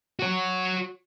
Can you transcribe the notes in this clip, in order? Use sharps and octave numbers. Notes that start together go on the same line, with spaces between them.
F#4 C#5